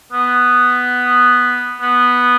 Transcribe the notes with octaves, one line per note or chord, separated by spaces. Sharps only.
B3
B3